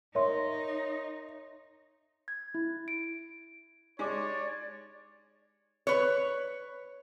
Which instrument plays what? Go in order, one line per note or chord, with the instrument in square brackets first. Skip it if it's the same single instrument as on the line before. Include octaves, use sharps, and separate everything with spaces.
[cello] D#4 [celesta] A#4 E5 C6 [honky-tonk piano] C#5
[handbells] G#6
E4
D7
[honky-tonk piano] G#3 [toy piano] D#4 G4 D6 [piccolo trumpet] C#5 [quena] D5
[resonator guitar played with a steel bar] B4 C#5